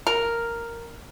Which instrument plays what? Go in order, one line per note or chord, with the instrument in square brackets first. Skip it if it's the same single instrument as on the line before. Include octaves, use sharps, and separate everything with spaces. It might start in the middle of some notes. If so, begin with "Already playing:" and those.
[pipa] A#4